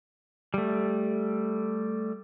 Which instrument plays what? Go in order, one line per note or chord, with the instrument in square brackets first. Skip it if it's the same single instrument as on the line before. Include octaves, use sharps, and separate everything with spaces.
[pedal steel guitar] G3 A3